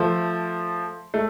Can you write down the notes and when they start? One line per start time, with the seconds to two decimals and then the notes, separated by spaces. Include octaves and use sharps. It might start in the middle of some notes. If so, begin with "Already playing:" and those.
Already playing: F3 A3
1.14 A3